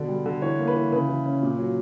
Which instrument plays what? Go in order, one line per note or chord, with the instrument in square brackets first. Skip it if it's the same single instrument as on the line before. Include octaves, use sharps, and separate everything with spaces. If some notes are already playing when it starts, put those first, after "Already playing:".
Already playing: [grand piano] B2 D3 D5
G3
D3
E3 C#5
A#3
B4
E3
C#3 B4
E3
C#4
A#2
F#3